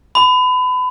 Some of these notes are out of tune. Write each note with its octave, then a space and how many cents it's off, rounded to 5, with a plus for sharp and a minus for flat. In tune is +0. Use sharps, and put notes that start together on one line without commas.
B5 +30